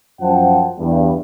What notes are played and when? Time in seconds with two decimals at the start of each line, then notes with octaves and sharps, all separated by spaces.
0.21 F#2 F3 C5 F#5 G5 A5
0.77 E2 G2